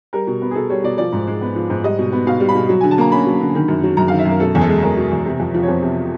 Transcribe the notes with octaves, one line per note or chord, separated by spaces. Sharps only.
G3 A#4
B2
B3
G#4
B2 A4
G3 C#5
B2 D5
F3 D5
G#2
G#3
B3
F3
G#2
G3 D#5
B2
B3
B2 F5
G3
B5
B2
F#3
D3 G#5
A5
A#3 A#5
C#4 B5
F#3
D3
D#3
F#2
F#3
F#2 A#5
D#3 F5
E5
F#2 A#4
B2 A4
E2 G#4
A4
G#3
E2 A#4
B2
E2
C3
F2
F3
C#5
F2 C5
C3